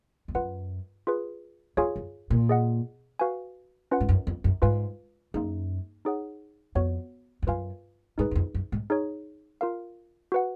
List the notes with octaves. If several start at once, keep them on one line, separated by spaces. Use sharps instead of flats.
F2
F#2 F4 B4 F#5
F4 G#4 B4
F2 F4 G#4 C#5 F5 G#5
F#2
A#2
G#4 D#5 F#5
F#4 B4 F5 G#5
C#4 F4 B4 F#5
G#2
F#2
F2
F#2
G#2 F4 B4 F5 G#5
F#2 A#3 D#4 G#4
D#4 G#4 C#5 F#5
F2 B3 F#4 C#5 F#5
F2
F#2 F4 B4 F5 G#5
G#2 D#4 G#4 B4
F#2
F2
F#2
G#2
D#4 G#4 C#5
F4 A#4 F5
F#4 B4 F#5